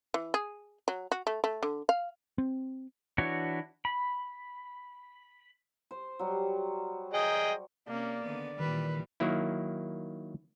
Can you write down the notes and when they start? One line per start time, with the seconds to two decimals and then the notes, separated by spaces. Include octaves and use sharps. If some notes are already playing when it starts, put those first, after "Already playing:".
0.14 E3
0.34 G#4
0.88 F#3
1.12 F#4
1.27 A3
1.44 A3
1.63 D3
1.89 F5
2.38 C4
3.18 E3 D4 E4 F#4 C#5
3.85 B5
5.91 C5
6.19 F#3 G3
7.14 G#4 D#5 G5
7.88 C3 A#3 C#4 D5
8.22 D3 D#3 B3
8.59 A#2 D#3 E3 G3 B4
9.20 D#3 F#3 A#3 E4